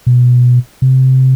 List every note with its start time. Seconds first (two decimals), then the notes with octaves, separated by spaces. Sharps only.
0.07 B2
0.82 C3